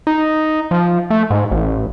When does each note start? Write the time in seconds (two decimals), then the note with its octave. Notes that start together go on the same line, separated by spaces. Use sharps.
0.07 D#4
0.71 F3
1.10 A3
1.30 G#2
1.51 A1